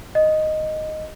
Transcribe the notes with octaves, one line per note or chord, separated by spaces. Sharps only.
D#5